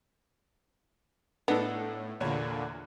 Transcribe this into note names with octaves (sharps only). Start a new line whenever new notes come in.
A2 B3 D4 D#4 A4
E2 A#2 D3 C#5